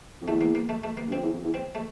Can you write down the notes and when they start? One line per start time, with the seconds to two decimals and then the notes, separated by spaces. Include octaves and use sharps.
0.21 F2
0.27 E2 A3
0.41 A#3
0.55 A#3
0.69 A3
0.84 A3
0.97 A#3
1.07 G2
1.12 F2 C4
1.22 E2
1.33 F2
1.43 E2
1.54 C4
1.75 A3